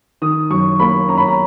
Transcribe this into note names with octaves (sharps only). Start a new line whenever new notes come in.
D#3 D#6
F#2 C#6
A#3 B5
C#4 A#5
B5
A#5